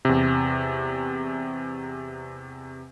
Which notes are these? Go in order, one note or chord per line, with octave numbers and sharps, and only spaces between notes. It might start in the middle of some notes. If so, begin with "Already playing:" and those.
E2 C3